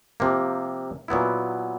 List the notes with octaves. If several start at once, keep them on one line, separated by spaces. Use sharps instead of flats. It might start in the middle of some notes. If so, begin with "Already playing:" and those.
C3 F3 A#3
A#2 F#3 B3 E4